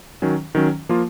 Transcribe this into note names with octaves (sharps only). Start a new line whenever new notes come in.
D#3 F#3 C#4
D#3 F#3 C#4
F3 A#3 F4